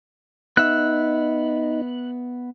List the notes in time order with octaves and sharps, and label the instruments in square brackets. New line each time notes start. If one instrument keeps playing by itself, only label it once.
[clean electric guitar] B3 E5 [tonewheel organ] D#4 [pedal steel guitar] F#6